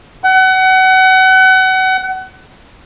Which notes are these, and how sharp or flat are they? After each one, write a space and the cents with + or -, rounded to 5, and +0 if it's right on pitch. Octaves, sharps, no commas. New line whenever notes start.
F#5 +30